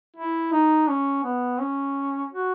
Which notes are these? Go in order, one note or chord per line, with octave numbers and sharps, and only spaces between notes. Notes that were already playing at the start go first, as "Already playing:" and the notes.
E4
D#4
C#4
B3
C#4
F#4